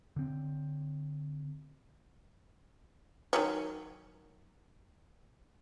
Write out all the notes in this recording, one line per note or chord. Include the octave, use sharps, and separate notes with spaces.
D3 C4
D#3 F#3 C#4